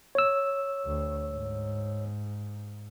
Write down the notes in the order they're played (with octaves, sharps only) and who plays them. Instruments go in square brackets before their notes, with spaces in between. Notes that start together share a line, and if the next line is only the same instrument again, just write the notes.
[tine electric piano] C#5 E6
[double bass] D2
G#2